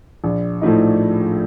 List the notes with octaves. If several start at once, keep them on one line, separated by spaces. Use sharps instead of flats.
A#1
A2 F3 A3 D#4